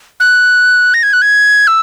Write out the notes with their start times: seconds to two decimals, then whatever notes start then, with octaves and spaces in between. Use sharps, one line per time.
0.20 F#6
0.94 A#6
1.03 G#6
1.13 F#6
1.22 G#6
1.67 E6